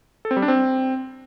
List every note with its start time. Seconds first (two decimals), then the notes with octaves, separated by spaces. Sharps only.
0.25 A4
0.31 C4
0.37 G3
0.42 D4
0.48 C4